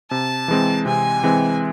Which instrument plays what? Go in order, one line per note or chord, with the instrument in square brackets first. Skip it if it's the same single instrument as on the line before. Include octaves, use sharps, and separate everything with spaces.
[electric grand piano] C3 [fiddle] A5
[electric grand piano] E3 G#3 C4
[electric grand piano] C3 [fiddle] G#5
[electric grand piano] E3 G#3 C4